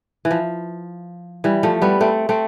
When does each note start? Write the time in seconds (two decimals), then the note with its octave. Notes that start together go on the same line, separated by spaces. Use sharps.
0.25 E3
0.31 F3
1.44 E3 G3
1.63 F3 A3
1.82 G3 B3
2.00 A3 C4
2.29 A3 C4